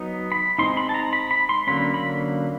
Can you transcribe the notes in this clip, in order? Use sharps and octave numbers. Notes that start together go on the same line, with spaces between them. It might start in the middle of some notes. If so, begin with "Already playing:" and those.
Already playing: F#3 B3 D#4
B5
G#3 C4 D#4 C6
B5
A5
A#5
B5
B5
C6
D3 F#3 A#3 C#4 B5
B5